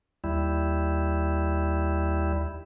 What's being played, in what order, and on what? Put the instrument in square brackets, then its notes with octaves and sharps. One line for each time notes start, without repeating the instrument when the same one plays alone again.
[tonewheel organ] D#2 G3 E4